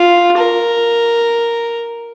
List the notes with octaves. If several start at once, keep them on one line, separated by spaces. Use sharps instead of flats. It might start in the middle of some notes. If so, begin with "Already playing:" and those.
Already playing: F4
A#4